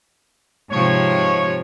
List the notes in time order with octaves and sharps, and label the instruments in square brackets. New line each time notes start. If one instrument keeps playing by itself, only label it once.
[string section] G#2 C3 F3 [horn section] C#5